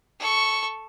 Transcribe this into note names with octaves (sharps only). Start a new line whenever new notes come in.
A4 C#6